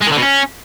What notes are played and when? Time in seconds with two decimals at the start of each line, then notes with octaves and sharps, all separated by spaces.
0.01 G#3
0.06 D#3
0.11 D3
0.17 B2
0.22 C#4